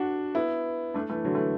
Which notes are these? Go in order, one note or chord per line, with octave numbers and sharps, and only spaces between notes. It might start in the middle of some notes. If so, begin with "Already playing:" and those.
Already playing: D4 F#4
B3 E4
A3 D4
E3 A3
D3 F#3
E3 A3